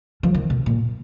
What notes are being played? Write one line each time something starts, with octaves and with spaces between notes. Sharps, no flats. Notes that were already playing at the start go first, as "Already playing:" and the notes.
F3
D#3
B2
A#2